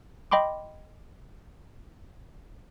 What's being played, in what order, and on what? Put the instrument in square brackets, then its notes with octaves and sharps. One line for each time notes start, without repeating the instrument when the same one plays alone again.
[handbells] D#5 G5 B5 C6 D6